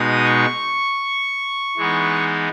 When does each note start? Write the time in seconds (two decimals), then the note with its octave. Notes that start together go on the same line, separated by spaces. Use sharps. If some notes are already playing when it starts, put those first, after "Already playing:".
Already playing: B2 G#3 D#4 D#6
0.26 C#6
1.77 E3 G#3 B3 D#4